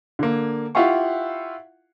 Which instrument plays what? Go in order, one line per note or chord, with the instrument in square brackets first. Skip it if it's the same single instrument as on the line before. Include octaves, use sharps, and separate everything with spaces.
[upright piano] D3 A#3
E4 F4 G4 F5 F#5 C#6